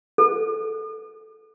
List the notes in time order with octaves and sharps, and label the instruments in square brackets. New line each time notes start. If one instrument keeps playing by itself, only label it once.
[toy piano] A4